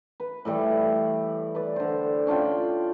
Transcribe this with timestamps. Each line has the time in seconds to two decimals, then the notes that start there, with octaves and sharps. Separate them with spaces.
0.20 B4
0.45 A2 E3 G3
1.55 B4 D5
1.76 D3 C5
2.27 C#4 D4 F4 G5